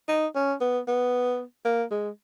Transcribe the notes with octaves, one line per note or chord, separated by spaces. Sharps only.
D#4
C#4
B3
B3
A#3
G#3